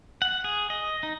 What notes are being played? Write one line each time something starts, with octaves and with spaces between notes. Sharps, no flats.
F#5
G#4
D#5
D#4